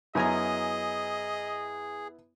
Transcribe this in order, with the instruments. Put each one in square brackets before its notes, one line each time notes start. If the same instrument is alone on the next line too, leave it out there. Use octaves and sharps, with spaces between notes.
[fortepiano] F#2 G#5 A#5 [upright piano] B3 E4 [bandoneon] G#4 [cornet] D#5